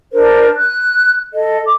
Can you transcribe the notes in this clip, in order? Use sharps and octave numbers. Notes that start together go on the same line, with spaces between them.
D4 A#4 C5
F#6
A4 D#5
D6